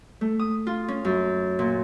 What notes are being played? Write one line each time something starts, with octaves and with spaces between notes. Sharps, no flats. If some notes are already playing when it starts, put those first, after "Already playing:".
A3
D#6
F4
C#4
F#2
A#2